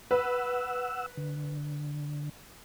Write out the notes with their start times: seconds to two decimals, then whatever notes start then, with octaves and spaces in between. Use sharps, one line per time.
0.11 B4 F#5 E6
1.17 D3